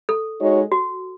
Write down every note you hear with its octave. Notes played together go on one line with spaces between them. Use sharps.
A4
G#3 D#4 F#4 C#5
F#4